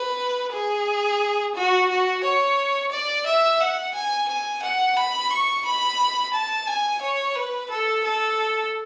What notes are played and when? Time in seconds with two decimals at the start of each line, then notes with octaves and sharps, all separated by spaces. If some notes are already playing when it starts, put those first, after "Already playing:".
Already playing: B4
0.52 G#4
1.55 F#4
1.89 F#4
2.23 C#5
2.91 D5
3.26 E5
3.60 F#5
3.94 G#5
4.28 G#5
4.62 F#5
4.96 B5
5.30 C#6
5.65 B5
6.34 A5
6.67 G#5
7.01 C#5
7.35 B4
7.70 A4
8.04 A4